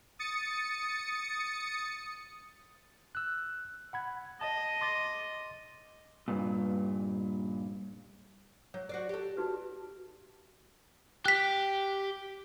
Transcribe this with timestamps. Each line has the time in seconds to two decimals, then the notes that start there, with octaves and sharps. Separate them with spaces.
0.19 D#6 A6 C#7
3.15 E6 F#6
3.93 F#5 B5 G#6
4.41 D#5 A5
4.81 C6 D6 A6
6.28 G2 A#2
8.74 F#3 C#5
8.89 F#4 C5 D5
9.09 G4 A4
9.37 D#4 F#4 B4
11.25 G4 F#6 B6